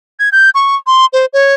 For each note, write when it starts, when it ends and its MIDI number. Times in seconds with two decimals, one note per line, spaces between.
0.20 0.29 92
0.32 0.50 91
0.55 0.76 85
0.87 1.06 84
1.13 1.26 72
1.33 1.55 73